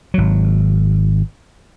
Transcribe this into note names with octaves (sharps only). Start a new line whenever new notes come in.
G#1 F#3